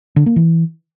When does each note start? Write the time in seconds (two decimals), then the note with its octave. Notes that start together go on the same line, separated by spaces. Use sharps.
0.16 D3
0.26 A#3
0.36 E3